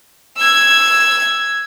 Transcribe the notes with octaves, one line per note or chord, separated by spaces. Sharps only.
E6 G#6